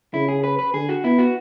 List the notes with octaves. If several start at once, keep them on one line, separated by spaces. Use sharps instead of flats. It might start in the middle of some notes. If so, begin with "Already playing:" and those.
C#3 E4
G#4
B4
B4
D3 G#4
F#4
B3 E4
F#4